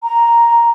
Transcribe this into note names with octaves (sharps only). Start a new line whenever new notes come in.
A#5